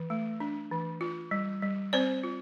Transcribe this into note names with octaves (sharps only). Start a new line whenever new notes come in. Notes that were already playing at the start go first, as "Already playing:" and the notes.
Already playing: E3
A3
D4
E3
F4
G3
G3
C4 C5 D5
F4